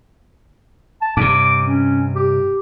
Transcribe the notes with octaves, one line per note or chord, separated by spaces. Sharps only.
A5
G2 C3 D6
C#4
G4